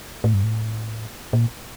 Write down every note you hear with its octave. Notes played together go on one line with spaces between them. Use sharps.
A2
G2
A2
A#2